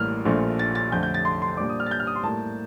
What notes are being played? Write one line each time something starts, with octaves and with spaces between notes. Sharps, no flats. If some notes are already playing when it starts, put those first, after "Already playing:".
Already playing: A1 A2 G3 A#3 F6
A#1 A#2 A3 D4 F4
A6
A6
F2 D3 A3 G6
G6
A6
C6
C6
A#2 G3 D4 D6
D#6
F6
A6
G6
F6
D#6
C6
A2 G3 A#3 A5